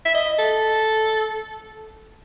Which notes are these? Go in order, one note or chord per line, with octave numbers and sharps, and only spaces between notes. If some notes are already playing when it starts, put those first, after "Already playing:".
E5
D#5
A4